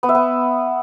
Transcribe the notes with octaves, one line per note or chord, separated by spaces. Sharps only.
B3
E5
B3